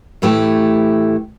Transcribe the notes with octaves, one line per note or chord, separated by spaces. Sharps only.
A2 E3 A3 E4 G4